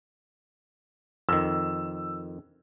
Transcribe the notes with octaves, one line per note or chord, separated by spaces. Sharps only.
F2 D#3 E6